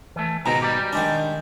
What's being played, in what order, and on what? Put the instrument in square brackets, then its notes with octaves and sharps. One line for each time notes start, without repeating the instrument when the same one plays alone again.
[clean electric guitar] E3 A3
[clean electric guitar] C#2 D#3 A#5 [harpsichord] G#2 B2
[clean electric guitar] G3 G4
[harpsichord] D#3 G#3 D4